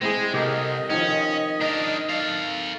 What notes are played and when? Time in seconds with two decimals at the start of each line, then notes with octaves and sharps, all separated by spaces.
0.02 G#3 C4 E4 G#4
0.34 C2 G4 A4 A#4 D#5
0.90 D#3 F3 C#4
1.61 D4 D#4 A#4
2.09 A4 F5